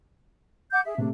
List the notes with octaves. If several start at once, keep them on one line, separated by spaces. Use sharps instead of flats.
F#5 D6 G6
G#4 E5
C3 A3 D4